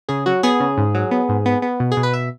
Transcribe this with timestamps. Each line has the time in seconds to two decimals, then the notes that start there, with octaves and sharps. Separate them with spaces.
0.09 C#3 G#4
0.26 F#3 F#4
0.43 B3 G#4
0.60 C#3
0.78 G#2
0.95 F#3
1.11 B3
1.29 G#2
1.46 B3
1.62 B3
1.80 B2
1.92 G#4
1.97 B2
2.03 B4
2.13 E5